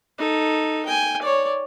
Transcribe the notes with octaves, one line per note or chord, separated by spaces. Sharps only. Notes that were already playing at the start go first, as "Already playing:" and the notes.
D#4 A4
G5 G#5
C#5 D5